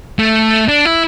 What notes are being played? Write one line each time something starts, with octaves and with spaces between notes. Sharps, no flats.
A3
D4
E4